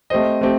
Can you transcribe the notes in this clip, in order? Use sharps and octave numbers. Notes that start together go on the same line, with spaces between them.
A3 C4 G4 C5 D#5
A3 C4 G4